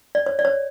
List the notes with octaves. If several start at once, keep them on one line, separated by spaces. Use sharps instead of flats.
D5
C#5
D5
C#5